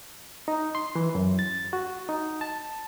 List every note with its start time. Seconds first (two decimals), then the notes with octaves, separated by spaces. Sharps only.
0.48 D#4
0.75 C6
0.96 E3
1.15 F#2
1.39 A6
1.73 F#4
2.09 D#4
2.41 A5